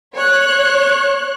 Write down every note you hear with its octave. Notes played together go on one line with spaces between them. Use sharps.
C#5 F#6